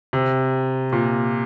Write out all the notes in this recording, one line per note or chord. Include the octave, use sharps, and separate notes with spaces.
C3
A#2